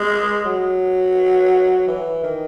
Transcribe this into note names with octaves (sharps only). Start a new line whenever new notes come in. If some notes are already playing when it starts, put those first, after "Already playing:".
Already playing: G#3
F#3
E3
D#3